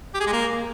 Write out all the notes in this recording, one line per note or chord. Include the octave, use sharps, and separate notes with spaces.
G4
G#4
G#3
A#3